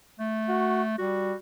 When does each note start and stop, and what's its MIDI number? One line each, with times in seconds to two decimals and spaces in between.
0.19 0.96 57
0.48 0.82 66
0.98 1.33 55
0.98 1.36 66